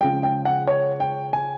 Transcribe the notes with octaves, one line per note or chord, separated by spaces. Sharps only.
C#3 F3 G#3 G5
G5
F#5
C#5
G5
G#5